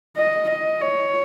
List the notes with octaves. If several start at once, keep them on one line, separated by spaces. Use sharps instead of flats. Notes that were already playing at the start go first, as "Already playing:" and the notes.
D#5
D#5
C#5